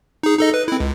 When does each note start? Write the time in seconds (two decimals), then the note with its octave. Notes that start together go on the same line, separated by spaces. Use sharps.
0.23 D#4 G#4
0.38 D#4 A4 D#5
0.54 B4
0.68 C4 E4
0.80 C#2